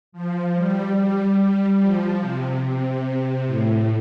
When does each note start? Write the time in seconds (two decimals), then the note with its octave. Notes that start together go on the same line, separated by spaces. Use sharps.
0.12 F3
0.54 G3
0.96 G3
1.80 F3
2.21 C3
2.62 C3
3.46 A2